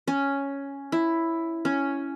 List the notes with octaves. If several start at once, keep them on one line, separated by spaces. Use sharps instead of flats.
C#4
E4
C#4